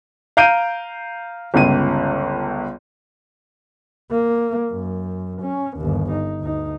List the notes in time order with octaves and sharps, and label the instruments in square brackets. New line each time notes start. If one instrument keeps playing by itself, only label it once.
[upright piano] F5 A#5 G6 D7 D#7
G1 C#2 D#7
[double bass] A#3
F#2
C#4
G1 D#2
D#4
D2 D#4